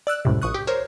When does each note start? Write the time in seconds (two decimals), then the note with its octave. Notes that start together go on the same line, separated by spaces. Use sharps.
0.07 D5 E6 F#6
0.25 C#2 F#2 A2 C3
0.42 A#1 C#6 D#6 F#6
0.54 G4
0.67 A#4 C5 C#5